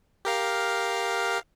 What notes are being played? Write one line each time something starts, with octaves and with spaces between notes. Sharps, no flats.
G4 A#4 F5